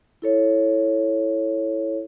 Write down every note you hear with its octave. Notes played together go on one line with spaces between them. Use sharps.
E4 A4 C#5